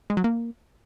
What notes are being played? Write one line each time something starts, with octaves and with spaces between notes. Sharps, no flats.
G#3
F#3
A#3